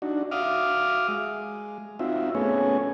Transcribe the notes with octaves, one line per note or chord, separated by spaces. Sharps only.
D4 D#4 F#4
F#4 E5 F5 D6 D#6 F6
G#3
C4 D#4 F4 F#4 E5
A3 B3 C#4 G#4 C#5